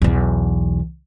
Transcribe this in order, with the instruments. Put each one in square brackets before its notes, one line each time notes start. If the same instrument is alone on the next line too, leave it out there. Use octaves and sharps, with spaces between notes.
[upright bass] B1 E2